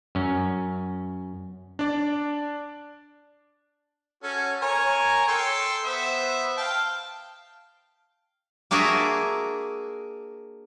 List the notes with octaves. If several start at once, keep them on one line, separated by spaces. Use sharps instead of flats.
F#2 C#4
D4 D5
C#4 F#4 A4
A#4 C#5 G#5
A4 G5 C6
B3 C5 E5
F5 G5 A5
A#3 D4 F#4 G#4 A#4 E5